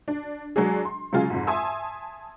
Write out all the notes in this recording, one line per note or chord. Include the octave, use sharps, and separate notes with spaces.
D4
F#3 G#3 D4 F#4 G#4
C6
C#3 F#3 G#3 F4 G#4
F2 G#2
E5 G#5 A5 C6 D#6 E6